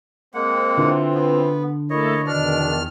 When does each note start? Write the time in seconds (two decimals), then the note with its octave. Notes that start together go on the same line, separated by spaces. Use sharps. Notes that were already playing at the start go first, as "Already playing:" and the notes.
0.34 G#3 A#3 C4 F#5
0.78 D3 E3 F4
1.14 B3
1.90 A3 A#3 E4 A4 C#5 D#5
2.27 E2 B2 D#3 D4 D5 F6